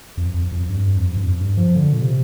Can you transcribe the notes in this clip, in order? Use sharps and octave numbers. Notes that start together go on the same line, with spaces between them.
F2
F2
F2
G2
F2
G2
F2
G2
F3
D3
A#2
C3